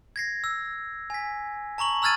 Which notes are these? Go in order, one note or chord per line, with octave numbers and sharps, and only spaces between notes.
G#6 A#6 C7
E6
G#5 B6
A5 A#5 C#6 F#7
A#5 E6 F6 G#6 A6 D#7